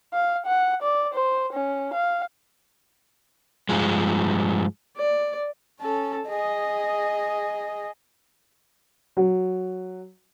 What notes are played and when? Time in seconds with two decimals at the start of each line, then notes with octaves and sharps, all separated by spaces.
0.13 F5
0.46 F#5
0.82 D5
1.14 C5
1.53 C#4
1.93 F5
3.69 G2 F3 G#3
4.97 D5
5.81 C#4 A4
6.27 G#4 D#5
9.17 F#3